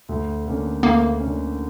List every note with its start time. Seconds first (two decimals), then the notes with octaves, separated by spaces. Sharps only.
0.09 D2
0.46 D3 A#3 C#4
0.83 D2 A#3
1.20 D3 A#3 C#4